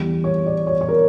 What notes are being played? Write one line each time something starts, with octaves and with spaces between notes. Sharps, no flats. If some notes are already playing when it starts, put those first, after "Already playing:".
Already playing: E2 E3 G3
C#5
D5
C#5
C#5
A#4